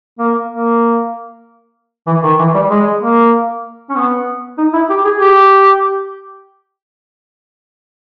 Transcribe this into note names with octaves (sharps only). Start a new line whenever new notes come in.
A#3
A#3
E3
D#3
E3
G3
G#3
A#3
C#4
B3
D#4
E4
G4
G#4
G4